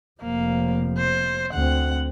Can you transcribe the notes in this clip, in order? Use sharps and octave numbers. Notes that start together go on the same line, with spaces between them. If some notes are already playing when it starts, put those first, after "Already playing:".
F1 F3 A#3
C5
D2 C4 F#5